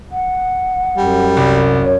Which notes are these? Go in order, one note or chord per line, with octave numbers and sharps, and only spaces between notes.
F#5
F#2 G3
C2
C#5